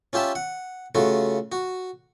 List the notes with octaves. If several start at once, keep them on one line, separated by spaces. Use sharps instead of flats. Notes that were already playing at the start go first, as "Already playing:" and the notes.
C#4 F4 G4 E5 A5
F#5
C#3 A3 F4 F#4
F#4